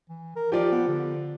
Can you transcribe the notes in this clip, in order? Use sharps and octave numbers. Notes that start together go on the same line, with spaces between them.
E3
A#4
F3 G4 D5
B3
D3